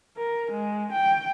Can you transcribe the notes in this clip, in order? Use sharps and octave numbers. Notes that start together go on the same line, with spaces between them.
A#4
G#3
G5